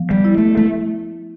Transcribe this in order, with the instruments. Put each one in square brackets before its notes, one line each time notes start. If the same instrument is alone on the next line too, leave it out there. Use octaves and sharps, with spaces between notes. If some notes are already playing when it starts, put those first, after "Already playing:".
Already playing: [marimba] F3 B3
[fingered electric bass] G3
[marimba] E4
[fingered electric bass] A3
A3